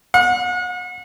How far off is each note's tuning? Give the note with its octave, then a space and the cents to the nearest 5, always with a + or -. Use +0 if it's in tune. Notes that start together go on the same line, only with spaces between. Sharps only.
F#5 -40